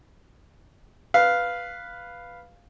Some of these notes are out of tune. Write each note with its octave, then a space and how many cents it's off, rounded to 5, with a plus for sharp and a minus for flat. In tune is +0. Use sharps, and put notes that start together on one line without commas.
B4 +0 F5 +0